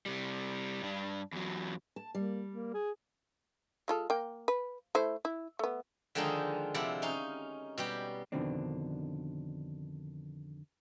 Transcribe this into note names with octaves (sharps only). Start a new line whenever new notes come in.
C3 G3
G2 D4
E2 F#3
A5
G3 A#3
A#3
G#4
G#3 F4 A4
A#3 G5
B4
A3 E4 C5
E4
A3 B3
D3 D#3 F3 G#3 D4 D#4
C3 F3 E4 D5 F#5
C#4 D#4 F5
B2 G3 G4
F2 B2 D3 D#3 C4 D4